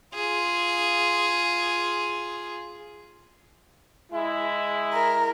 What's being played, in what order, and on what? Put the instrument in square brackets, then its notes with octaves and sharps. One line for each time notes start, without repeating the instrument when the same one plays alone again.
[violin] F4 G#4
[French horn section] G#3 E4
[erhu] A#4